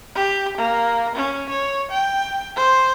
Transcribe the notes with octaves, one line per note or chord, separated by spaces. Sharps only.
G4
A#3
C#4
C#5
G5
C5